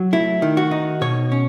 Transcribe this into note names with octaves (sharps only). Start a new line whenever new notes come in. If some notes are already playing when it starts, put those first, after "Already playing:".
Already playing: F#3
A3 E4
D#3
F#4
D#4
B2 C#5
C#4